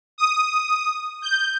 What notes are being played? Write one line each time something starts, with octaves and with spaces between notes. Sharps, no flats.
D#6
G6